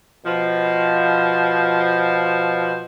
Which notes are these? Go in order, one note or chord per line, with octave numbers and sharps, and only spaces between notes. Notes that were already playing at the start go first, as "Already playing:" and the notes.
B2 F3